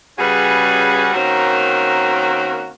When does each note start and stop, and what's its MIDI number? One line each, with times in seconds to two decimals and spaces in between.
0.19 1.10 49
0.19 1.10 55
0.19 1.10 61
0.19 1.10 66
0.19 1.10 68
0.19 1.10 71
1.13 2.69 51
1.13 2.69 58
1.13 2.69 60
1.13 2.69 61
1.13 2.69 66